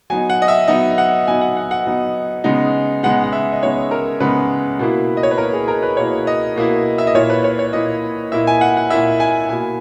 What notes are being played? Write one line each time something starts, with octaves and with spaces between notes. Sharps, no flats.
F#3 B3 D#4 G#5
F#5
D#5
E5
F#3 B3 D#4 D#5
F#5
F#3 B3 D#4 G#5
F#5
F#5
F#5
F#3 B3 D#4
C#3 G#3 B3 D#4
C#3 G#3 B3 D#4 F#5
F#5
E5
D#5
C#3 G#3 B3 D#4 C#5
A#4
C#3 G#3 B3 D#4 B4
B2 A#3 E4
D#5
C#5
B4
B2 A#3 E4 A#4
G#4
A#4
B4
B2 A#3 E4 C#5
D#5
B2 A#3 E4
E5
D#5
A#2 A#3 E4 C#5
B4
C#5
C#5
A#2 A#3 E4 D#5
A#2 A#3 E4 E5
G#5
F#5
F#5
A#2 A#3 E4 E5
G#5
B2 A#3 E4 G#5